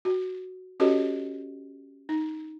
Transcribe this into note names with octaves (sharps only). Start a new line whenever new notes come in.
F#4
C#4 F#4 G4 A4 C#5 D#5
D#4